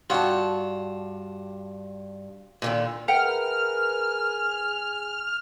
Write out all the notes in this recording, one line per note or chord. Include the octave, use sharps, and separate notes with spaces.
G2 F4 F#4 A5
A#2 D3 D#3
G#4 A#4 B4 E5 F#5 G5 F6